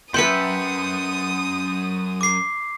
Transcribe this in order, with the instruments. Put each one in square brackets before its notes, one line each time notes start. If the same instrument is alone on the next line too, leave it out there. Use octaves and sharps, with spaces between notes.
[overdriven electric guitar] F#2 [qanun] B4 E5 G5 [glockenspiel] C6 G6 C#7 [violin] D#6
[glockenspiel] D6 C7